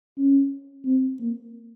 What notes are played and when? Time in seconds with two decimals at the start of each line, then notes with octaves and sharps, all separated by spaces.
0.18 C#4
0.85 C4
1.20 A#3